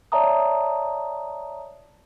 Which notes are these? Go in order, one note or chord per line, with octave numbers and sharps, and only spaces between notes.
C#5 D5 E5 A5 A#5 D#6